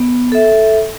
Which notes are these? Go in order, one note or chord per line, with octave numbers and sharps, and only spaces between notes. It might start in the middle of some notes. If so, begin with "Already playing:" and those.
Already playing: B3
A4 E5